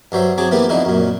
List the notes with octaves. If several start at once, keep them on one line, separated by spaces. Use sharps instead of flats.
G2 F#3 C5 E5
F#3 C4 G#4 D6
E3 A#3 B3 G4
F2 D3 D#4 E4
F#2 A#2